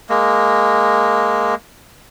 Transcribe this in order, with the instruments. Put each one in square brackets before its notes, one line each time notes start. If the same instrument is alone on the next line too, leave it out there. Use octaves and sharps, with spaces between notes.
[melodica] G#3 A#3